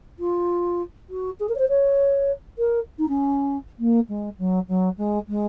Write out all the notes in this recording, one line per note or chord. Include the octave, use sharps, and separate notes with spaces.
F4
F#4
G#4
A#4
C#5
C5
C#5
A#4
D#4
C#4
A#3
G#3
F#3
F#3
G#3
G#3